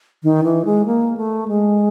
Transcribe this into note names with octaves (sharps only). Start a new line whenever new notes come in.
D#3
E3
G#3
A#3
A3
G#3